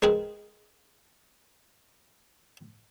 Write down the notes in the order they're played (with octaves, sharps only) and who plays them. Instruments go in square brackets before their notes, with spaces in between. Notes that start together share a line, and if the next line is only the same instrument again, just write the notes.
[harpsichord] G#3 C4 G#4 A#4 B4 G#5